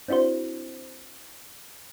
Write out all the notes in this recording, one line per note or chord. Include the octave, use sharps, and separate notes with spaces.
C4 D4 E4 F#4 C5